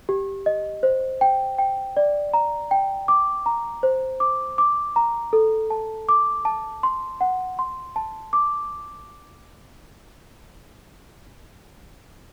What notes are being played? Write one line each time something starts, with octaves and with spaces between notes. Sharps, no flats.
G4
D#5
C5
G5
G5
D5
A#5
G5
D6
A#5
C5
D6
D6
A#5
A4
A5
D6
A5
C6
F#5
C6
A5
D6